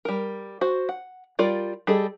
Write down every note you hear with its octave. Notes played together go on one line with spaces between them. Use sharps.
G3 A#4
F#4 C5
F#5
G3 F4 A#4 D5
G3 G#4 A4 D#5